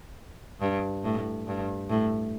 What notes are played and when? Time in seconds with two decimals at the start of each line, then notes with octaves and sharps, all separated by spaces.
0.61 G2
1.04 A2
1.47 G2
1.90 A2